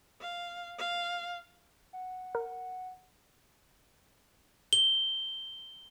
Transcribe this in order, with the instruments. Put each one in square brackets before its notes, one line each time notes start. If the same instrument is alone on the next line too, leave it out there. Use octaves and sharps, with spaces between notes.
[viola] F5
F5
[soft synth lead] F#5
[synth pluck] A#4
[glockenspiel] G7